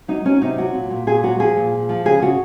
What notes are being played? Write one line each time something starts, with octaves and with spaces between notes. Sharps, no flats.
F#3 D#4
F#3 C#4
C3 D#4
F#3 F#4
A#2
A#2
A#2 G#4
F#3 F#4
F3 G#4
A#2
F3
F3
C#3 G#4
C#3 F#4